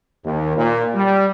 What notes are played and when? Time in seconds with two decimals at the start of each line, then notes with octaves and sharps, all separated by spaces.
0.24 D#2
0.56 A#2
0.95 G3